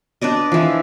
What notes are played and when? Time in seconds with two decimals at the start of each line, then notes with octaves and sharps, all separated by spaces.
0.22 D4 B4 D5 D#5
0.52 E3 F3